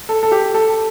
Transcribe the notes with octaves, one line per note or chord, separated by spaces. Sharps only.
A4
A4
G4
A4